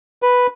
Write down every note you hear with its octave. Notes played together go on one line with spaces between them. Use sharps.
B4